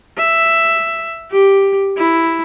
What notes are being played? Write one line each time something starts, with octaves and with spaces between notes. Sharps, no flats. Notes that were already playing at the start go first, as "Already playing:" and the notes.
E5
G4
E4